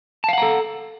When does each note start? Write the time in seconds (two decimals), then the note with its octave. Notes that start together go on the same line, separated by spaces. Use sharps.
0.24 A5
0.29 F5
0.33 F#5
0.38 A#5
0.43 A4